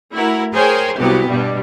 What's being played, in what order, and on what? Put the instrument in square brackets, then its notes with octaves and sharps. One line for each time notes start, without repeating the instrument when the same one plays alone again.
[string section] A3 E4 F#4 A#4
G#4 A#4 C5 C#5 G5 G#5
C2 C3 E3 F#3 B3 G4
G2 B2 G3